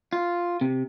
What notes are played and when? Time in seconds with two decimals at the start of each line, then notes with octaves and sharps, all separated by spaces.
0.13 F4
0.61 C3